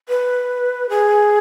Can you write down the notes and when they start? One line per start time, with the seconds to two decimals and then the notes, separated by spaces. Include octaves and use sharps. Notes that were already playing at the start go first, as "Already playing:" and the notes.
0.09 B4
0.89 G#4